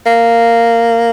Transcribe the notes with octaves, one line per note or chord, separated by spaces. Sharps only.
A#3